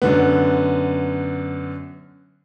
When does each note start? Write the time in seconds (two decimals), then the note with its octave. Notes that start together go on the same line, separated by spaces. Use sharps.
0.02 F#2 D3 B3